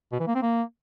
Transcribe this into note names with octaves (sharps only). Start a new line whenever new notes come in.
B2
E3
A#3
C4
A#3